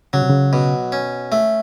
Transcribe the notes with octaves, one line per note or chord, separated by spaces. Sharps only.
C#3 F#3
C3
C#3
B2
C#4
A3